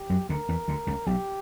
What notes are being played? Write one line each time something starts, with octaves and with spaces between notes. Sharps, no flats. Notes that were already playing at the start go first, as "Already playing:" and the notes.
Already playing: G4
F#2 F#3
D2 D3 A#4
E2 E3
D2 D3
C#2 C#3
B1 B2 G4